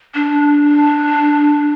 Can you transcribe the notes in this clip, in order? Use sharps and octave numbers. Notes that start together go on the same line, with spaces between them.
D4